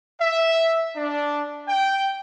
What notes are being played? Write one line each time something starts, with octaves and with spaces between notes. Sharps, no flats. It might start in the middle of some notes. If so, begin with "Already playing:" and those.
E5
D4
G5